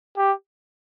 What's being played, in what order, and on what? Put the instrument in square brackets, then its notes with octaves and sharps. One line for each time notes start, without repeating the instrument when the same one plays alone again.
[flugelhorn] G4